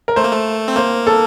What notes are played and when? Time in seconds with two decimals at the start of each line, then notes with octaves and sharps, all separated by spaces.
0.08 A#4
0.16 A3 C5
0.24 A#3
0.33 A3
0.68 C4
0.76 A#3 C5
1.07 A4